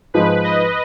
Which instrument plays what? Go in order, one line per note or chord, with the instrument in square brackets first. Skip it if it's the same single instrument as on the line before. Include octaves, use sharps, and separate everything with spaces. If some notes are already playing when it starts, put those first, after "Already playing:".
[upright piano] G#2 F3 G#3 D#4 [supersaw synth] B4
[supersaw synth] D#5